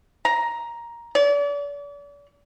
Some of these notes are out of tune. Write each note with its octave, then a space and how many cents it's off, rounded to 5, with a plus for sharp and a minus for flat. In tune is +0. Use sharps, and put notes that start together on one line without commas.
A#5 +10
D5 -40